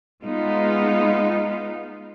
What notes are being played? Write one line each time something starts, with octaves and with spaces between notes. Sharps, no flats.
G#3 B3 D#4 F4